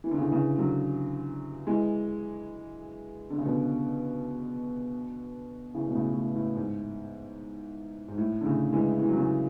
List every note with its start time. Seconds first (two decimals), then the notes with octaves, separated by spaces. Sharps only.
0.04 E3
0.11 D3
0.18 C#3 E3
0.31 C#3 E3
0.58 D3 F#3
1.67 E3 G#3
3.30 D3
3.38 C#3
3.45 B2 D3
5.74 C#3 E3
5.88 B2
5.95 A2 C#3
6.14 A2
6.35 A2
6.56 G#2
8.08 G#2
8.18 A2
8.41 D3
8.46 A2 C#3
8.73 E3 G#3
9.00 E3
9.09 F#3
9.17 C#3 E3